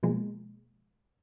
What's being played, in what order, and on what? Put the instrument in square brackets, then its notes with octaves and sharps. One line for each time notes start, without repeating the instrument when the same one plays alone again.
[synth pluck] B2 F3 G#3 A#3